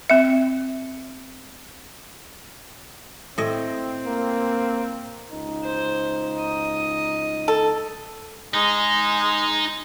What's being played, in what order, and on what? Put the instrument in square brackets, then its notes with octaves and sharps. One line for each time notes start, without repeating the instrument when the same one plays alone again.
[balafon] C4 E5
[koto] A2 D#5 [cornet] C4
[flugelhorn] A#3
[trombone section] C#2 D#4
[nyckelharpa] C5
D#5
[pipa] A4
[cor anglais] G#3 [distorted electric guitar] D#4